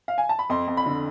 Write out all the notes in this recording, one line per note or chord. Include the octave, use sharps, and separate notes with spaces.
F5
G#5
A5
B5
F2 C6
F2
B5
D3